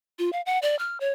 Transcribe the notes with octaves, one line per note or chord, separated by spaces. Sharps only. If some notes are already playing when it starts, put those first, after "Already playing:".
F4
F5
F#5
D5
F6
C#5